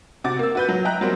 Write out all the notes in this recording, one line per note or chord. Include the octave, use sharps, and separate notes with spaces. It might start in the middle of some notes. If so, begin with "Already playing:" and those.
C3 F#4 D6 A6
A#3 E6
F#4 B4 G6
F#3
D#5 E5 G5 A#5 F#6
F#3 G3 A#3 C4